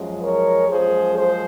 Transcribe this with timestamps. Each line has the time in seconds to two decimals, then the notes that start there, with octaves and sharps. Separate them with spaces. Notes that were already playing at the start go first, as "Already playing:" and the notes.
Already playing: F#2 F3 G#3
0.22 A#4 C#5
0.69 F#2 F3 G#3 G#4 C5
1.16 G#4 C5